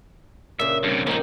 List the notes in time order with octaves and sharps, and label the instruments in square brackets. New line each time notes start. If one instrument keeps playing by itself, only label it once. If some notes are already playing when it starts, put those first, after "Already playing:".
[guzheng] A#2 C#3 [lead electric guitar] E5
[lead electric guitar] G2 C3
[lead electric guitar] F3 D#4 [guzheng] A#3 G5